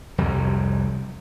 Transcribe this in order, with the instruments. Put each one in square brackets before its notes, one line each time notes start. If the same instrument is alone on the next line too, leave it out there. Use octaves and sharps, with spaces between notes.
[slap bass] C2 F2 F#3 G3